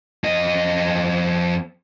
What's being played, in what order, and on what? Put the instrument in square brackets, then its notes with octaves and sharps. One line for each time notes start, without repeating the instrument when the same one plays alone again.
[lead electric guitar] F2 D#5